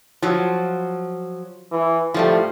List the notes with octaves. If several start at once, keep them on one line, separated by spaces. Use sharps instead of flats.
F3 F#3
E3
A2 F3 G3 A3